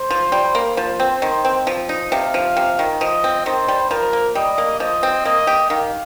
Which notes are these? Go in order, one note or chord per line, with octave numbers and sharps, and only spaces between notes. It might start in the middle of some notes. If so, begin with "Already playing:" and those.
Already playing: C5
F3
G3
A#3
F3 C5
C4
D#3
C4
F3
D#4
C3 F5
F3
C3
D#3
F3 D#5
C4
D#3 C5
G3
F3 A#4
A#3
G3 D#5
A#3
F3 D#5
C4
A#3 D#5
G4
D#3 F5